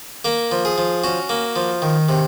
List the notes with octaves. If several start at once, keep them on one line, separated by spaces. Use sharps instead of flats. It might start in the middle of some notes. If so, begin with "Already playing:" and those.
A#3 A#4
F3
G#4
F3
C#4 F#4
A#3
F3
D#3
C3